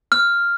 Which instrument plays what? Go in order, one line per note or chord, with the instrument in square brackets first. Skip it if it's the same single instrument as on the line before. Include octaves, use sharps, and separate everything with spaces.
[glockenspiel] F6